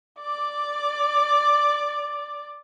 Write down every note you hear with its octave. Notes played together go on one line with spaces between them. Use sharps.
D5 D6